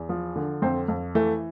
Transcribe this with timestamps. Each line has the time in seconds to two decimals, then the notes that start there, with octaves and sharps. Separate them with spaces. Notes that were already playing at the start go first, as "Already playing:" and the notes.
Already playing: E2
0.09 F3
0.36 D3
0.62 F2 C4
0.88 F2
1.15 E3 A3